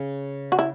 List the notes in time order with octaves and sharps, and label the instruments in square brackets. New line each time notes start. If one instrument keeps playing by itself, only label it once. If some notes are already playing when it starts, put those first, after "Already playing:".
Already playing: [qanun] C#3
[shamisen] F#4
E4